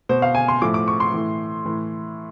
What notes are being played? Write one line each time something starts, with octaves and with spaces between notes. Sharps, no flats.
B2 C5
F5
G#5
C6
A2 F3 D6
D6
C#6
C6
A2 E3
A2 E3